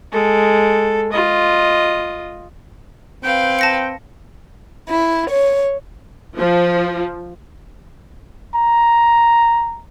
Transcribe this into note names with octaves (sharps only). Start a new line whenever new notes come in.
G#3 A4
F4 D#5
C4 B4 F5 G5
A5 A#6 C#7
E4
C#5
F3
A#5